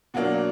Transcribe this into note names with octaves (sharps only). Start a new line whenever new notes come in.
B2 F#3 A#3 D4 F#4